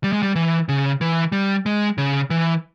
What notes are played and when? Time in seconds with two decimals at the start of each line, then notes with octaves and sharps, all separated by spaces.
0.04 G3
0.13 G#3
0.23 G3
0.35 E3
0.69 C#3
1.01 E3
1.32 G3
1.66 G#3
1.98 C#3
2.30 E3